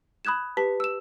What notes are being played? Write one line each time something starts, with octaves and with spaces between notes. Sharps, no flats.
B5 D#6 F#6 G#6 E7
G4 B4 A5 B6
E6 E7